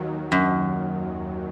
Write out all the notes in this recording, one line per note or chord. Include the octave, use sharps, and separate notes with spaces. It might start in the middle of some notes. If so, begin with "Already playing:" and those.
Already playing: D#2 D#3 F#3
F#2